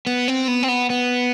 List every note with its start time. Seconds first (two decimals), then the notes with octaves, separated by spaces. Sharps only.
0.07 B3
0.28 C4
0.48 B3
0.63 C4
0.68 B3
0.90 B3